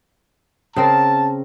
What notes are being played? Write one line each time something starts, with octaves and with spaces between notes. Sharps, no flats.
C#3 C4 A#4 A5